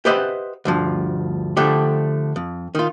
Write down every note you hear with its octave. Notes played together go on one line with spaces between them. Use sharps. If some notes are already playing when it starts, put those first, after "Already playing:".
G4 B4 C5 D#5 E5 F#5
D2 G2 F3
D3 F3 A3 D4 G4
F2
D#3 F4